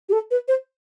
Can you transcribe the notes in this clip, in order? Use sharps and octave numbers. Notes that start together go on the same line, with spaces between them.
G4
A4
B4
C5